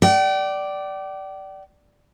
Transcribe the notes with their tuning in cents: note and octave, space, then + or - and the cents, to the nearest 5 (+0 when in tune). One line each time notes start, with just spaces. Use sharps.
D5 +0 G5 -40